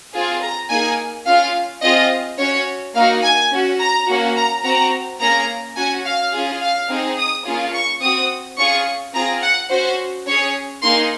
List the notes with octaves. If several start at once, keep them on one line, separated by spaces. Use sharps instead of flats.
C4 F4 G#4
A#5
A#3 D#4 G#4 G#5
C#4 F4 G#4 F5
C4 F4 G#4 D#5
C#4 F#4 C#5
A#3 D#4 F#4 F5
G#5
C#4 F#4
A#5
A#3 C#4 F#4
A#5
C4 F#4 A#5
A#3 C#4 G#4 A#5
C#4 F#4 G#5
F5
C#4 F4 G#4
F5
C4 D#4 G#4
D#6
A#3 C#4 F4 G#4
C#6
C4 F#4 D#6
C#4 F4 G#4 C#6
C4 F4 G#4 A#5
F#5
C#4 F#4 C5
C#4 G#4 C#5
A#3 D#4 G#4 C6